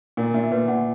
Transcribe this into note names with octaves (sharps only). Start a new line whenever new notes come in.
A#2 A#4
A#2 E5
A#2 B4
A#2 F#5